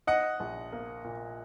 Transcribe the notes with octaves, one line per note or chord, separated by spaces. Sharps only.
D#4 D#5 F#5
A#1
A#3
A#2